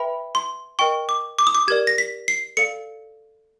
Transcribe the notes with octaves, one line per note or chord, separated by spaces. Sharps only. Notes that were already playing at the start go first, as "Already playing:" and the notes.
Already playing: B4 E5 G5 B5
C6
A#4 D#5 G5 C#6
D6
D6
D#6
D6
G4 A#4 D5 G#6
A#6
B6
C7
A4 D5 F5 C#7